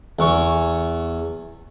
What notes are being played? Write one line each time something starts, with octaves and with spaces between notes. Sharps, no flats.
E2 C#6